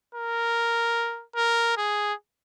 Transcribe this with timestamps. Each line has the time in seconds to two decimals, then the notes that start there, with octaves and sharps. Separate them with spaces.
0.15 A#4
1.36 A#4
1.77 G#4